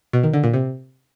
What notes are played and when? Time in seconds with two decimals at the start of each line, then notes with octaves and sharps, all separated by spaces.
0.13 B2
0.23 D#3
0.33 D3
0.44 A#2
0.54 C3